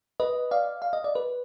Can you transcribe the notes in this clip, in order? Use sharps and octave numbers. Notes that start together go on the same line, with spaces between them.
B4 D#5
D5 F5
F5
D#5
D5
B4